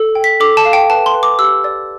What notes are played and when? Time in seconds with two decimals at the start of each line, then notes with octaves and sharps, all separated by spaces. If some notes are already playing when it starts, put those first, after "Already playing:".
Already playing: A4
0.15 G5
0.24 B6
0.40 A4 D6
0.57 A5
0.65 F5
0.73 G5
0.90 B4 A5
1.06 C6
1.14 B4
1.23 D6
1.39 G4 E6
1.64 D5